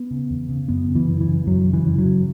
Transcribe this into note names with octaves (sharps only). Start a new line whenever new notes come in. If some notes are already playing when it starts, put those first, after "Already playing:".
Already playing: B3
C#3
E2
C#3
F#2 B3
C#3
E3
F#2
E3
C#3
F#2 F#3
C#3
E3
F#2
F#3
C#3